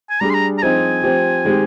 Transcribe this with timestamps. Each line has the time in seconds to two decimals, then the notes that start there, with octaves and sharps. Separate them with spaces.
0.10 G#5
0.21 G3 D4 G#4 A#5
0.30 C6
0.34 A#5
0.58 A#5
0.62 F3 C4 D#4 G#4 G#5
1.03 F3 C4 G4
1.44 D#3 G#3 C4 G4